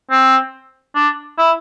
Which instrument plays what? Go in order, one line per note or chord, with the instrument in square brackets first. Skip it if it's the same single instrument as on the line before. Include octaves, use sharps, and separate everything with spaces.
[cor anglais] C4
D4
E4